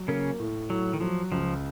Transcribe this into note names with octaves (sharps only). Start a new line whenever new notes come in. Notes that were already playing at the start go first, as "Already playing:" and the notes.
Already playing: F#3
C#3 A#3 C#4
A2
A2 F#3
D#3
F3 F#3
C#2 F3